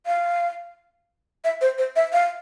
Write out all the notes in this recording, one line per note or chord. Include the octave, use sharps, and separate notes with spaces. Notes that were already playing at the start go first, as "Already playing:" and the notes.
F5
E5
C5
C5
E5
F5